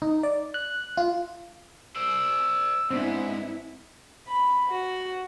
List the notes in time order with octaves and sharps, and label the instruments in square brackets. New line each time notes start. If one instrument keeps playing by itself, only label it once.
[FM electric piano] D#4
D5
F#6
F4
[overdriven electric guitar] C5 D5 [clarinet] E6
[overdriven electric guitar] G#2 [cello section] B3 E4 [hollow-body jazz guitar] C4 D4
[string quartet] B5
F#4